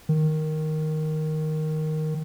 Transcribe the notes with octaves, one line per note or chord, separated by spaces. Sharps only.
D#3